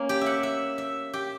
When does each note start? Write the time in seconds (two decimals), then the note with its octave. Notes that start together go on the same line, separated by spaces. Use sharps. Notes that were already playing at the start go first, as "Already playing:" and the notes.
Already playing: A#3 C#4
0.09 G4
0.21 E5 F#5
0.43 E5
0.78 E5
1.13 G4